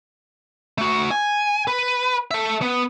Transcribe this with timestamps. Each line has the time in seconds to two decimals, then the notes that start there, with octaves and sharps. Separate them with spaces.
0.78 A3 F#4
1.11 G#5
1.68 B4
2.31 A4 E5
2.62 B3